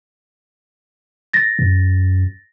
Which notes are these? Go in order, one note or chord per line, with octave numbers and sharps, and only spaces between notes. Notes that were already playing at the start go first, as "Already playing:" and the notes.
A6 A#6
F#2